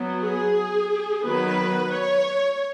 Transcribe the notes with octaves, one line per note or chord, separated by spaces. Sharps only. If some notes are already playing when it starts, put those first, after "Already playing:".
Already playing: F#3 B3
G#4
D#3 F#3 B3 B4
C#5